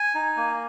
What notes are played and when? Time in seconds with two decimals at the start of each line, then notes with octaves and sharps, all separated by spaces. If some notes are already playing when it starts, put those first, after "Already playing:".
Already playing: G#5
0.15 D#4
0.37 A#3